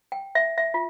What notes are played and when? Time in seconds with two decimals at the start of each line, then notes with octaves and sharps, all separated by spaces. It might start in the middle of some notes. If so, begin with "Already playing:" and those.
0.12 G5
0.35 E5
0.58 E5
0.74 F4